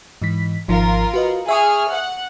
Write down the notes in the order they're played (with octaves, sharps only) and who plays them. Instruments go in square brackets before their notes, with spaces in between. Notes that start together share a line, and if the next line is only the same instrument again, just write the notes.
[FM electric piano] G#2 E3 B6
[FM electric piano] G#1 F3 [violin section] F4 A#4
[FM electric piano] F#4 B4 D#5
[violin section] G#4 F6 [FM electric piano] E5 C#6 D#6
[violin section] F#5